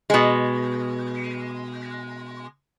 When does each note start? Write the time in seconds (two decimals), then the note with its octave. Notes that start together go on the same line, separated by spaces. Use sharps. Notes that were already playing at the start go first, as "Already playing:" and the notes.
0.10 B2 G#3